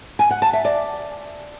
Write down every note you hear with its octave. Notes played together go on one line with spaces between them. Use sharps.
G#5
F#5
A5
E5
D5